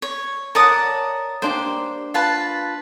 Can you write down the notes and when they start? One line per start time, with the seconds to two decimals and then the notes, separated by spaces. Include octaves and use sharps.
0.02 C#5
0.55 A#4 C#5 D5 F#5 A5 D#6
1.42 A#3 D4 G4 C5
2.14 F4 B4 A5